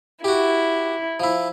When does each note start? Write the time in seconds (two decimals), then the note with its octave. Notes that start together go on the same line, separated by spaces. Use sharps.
0.24 E4 F#4 G4
1.20 F3 E4